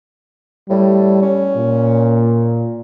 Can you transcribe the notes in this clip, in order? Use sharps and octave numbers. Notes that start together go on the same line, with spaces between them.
A2 G3
C#4
A#2